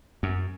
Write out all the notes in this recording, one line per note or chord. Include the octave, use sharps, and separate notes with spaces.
F#2